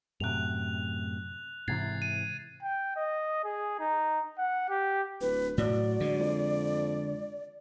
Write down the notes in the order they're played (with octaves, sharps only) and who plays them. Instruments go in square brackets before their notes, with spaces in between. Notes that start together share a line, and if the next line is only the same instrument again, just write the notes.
[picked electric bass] F#2 A2 C3 [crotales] F#6 F7
[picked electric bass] G#2 C3 E3 [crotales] G#6 A6 C7
[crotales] D#7
[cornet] G5
D#5
G#4
D#4
F#5
G4
[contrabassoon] D1 [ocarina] B4
[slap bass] A2 [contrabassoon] F#3 [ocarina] D5
[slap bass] D3 G#3
[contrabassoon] F2